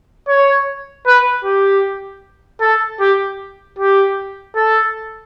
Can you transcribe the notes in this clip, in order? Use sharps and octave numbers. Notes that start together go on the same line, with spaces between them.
C#5
B4
G4
A4
G4
G4
A4